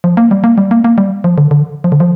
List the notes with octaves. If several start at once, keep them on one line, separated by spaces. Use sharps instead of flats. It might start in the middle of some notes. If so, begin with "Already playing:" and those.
F3
A#3
G3
A#3
G3
A#3
A#3
G3
F3
D3
D3
F3
D3
F3